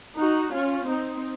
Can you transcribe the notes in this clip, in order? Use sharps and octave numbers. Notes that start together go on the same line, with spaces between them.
D#4 F#4
C#4 F4
C4 D#4